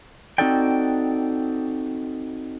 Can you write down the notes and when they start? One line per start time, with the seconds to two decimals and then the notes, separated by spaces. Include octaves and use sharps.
0.38 C4 D#4 F#4 A4 D5 G5